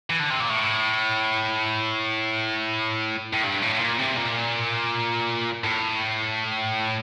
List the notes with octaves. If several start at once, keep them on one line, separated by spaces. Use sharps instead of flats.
E3
D3
C3
A#2
A2
A2
G2
A2
A#2
C3
A#2
A2